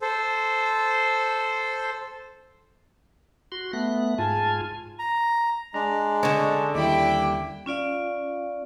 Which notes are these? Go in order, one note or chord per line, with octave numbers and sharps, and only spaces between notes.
A4 C5
F#4 C6
A3 B3 F#6
G#2 F4 G#5 A5
A#5
G#3 D4 A#5
D3 C#4 D#5 A5 C#6
D#2 G3 E4 G5 D6
C#4 F4 D5 F5